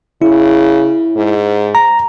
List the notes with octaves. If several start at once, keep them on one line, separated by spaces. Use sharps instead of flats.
C#3 E4
G#2
A#5